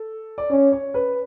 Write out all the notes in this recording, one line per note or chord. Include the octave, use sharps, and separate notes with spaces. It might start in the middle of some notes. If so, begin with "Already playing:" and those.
Already playing: A4
D5
C#4 C#5
C#5
B4